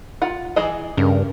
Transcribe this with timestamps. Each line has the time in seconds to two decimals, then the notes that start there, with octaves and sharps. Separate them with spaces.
0.22 F4 F#5
0.56 E3 G#4 D#5
0.97 G2 C#3 A#4